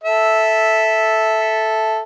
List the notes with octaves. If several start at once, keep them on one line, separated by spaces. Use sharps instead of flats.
A4 E5